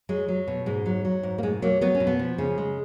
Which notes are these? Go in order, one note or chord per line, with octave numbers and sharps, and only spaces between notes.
F#3 G#3
F#3
B2
G#2 G#3
F#3
F#3
G#2
A#3
B2 G#3
F#3 A#3
F#3 B3
C#4
B2
B3
F3
C#3
G#3